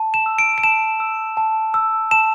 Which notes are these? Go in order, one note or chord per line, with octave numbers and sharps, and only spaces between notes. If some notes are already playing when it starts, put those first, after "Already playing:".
Already playing: A5
E7
E6
D7
D7
A5 E7
E6
A5
E6
A5 E7